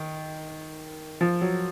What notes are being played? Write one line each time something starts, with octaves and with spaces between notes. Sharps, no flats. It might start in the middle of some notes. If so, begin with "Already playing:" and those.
Already playing: D#3
F3
F#3